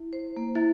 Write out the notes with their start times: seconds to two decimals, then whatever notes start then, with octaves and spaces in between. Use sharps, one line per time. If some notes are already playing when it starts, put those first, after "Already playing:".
Already playing: E4
0.13 C5
0.37 A#3
0.55 E4